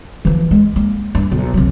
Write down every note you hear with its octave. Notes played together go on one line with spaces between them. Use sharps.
E3 F3
G#3
A#3
G2
B1
C2 F#3